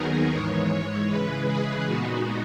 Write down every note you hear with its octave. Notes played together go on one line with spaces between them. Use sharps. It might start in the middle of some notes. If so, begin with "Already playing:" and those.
Already playing: D#2 D#3 F#3 B3 D#4 G#4 A#4
G#2 E3 G#3 C#5
C#3 E3 G#3 B4
G#4
A#2 G#3 B3 D#4 F#4